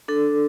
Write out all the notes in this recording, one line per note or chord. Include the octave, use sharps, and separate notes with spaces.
D4 A4